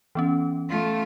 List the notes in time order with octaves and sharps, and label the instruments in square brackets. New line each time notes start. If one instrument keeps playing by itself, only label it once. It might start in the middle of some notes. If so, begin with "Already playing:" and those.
[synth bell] E3 B3 C#4
[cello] A3 F4